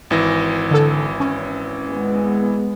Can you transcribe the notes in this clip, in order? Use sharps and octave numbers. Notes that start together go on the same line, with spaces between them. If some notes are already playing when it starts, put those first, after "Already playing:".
G#1 E3 A#6
D3 A4
C#4
G#3 B3